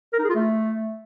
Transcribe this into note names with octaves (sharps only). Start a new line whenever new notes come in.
A#4
D#4
G#4
F4
A3